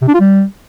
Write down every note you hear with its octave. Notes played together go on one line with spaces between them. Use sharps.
C3
D4
F4
G3